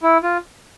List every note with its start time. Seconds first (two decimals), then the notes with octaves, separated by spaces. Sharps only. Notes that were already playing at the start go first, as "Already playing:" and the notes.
0.03 E4
0.23 F4